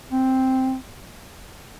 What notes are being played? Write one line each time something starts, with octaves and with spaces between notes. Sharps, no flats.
C4